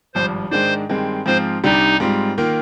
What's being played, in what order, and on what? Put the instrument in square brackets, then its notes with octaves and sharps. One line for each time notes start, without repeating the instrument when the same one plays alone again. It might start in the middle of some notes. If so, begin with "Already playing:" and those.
[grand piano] G#1 G2 F3 [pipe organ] C5
[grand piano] G#2 D#3 G#3 D4 [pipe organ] C5
[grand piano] G2 D#3 G#3 C4
[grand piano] G#2 F3 C4 F4 [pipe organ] C5
[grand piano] C2 C3 G3 D4 [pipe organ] D#4
[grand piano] G#2 G3 C4 F4
D#3 A#3 F4